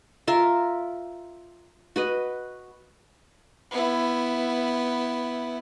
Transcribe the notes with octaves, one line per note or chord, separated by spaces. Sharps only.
F4 A#4 E5
F#4 B4 D#5
B3 E4